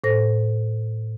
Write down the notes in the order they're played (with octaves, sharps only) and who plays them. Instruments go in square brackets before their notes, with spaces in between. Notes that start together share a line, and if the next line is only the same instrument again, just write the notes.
[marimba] A2 A4 C5 A#6